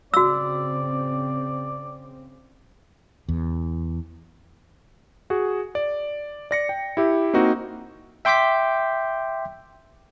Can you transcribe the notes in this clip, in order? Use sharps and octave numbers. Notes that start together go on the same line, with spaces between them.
C#3 C4 F#4 D5 E6
E2
F#4 G#4
D5
D5 A#6 C#7
G5
E4 G4 E5
A#3 C4 D#4 F#4
E5 G5 C6 D6 G6 B6